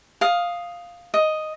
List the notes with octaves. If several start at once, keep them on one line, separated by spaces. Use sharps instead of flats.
F5 D#6
D#5